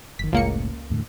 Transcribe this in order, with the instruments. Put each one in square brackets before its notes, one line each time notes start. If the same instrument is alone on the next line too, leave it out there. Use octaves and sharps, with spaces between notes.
[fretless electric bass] F#1 D#3 [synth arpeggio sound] B6
[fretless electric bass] F#1 A2 [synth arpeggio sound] C#2 A#3 C#7
[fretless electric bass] E2 A2 D3